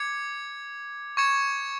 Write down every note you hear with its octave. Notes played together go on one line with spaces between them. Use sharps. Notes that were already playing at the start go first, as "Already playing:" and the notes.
Already playing: D6 G#6 C#7
C#6 G#6 C#7 E7